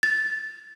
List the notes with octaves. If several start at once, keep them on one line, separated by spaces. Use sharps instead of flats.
A6